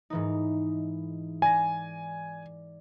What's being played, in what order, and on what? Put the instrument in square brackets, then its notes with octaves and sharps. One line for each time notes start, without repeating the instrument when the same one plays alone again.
[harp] G#2 E3 D#4
[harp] D5 A#6 [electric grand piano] G#5